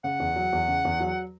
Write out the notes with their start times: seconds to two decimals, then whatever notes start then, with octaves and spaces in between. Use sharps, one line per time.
0.04 C#3 F#5
0.20 E2
0.36 F#3
0.53 E2
0.68 C#3
0.85 E2
1.00 F#3